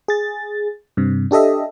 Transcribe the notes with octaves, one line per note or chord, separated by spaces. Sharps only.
G#4 A6
G2 C3
D4 G4 A4 D#5 E5